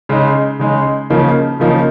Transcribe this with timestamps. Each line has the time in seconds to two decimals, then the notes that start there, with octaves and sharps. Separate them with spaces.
0.09 C#3 G#3 D#4
0.59 C#3 G#3 D#4
1.10 C#3 F3 A#3 D#4
1.60 C#3 F3 A#3 D#4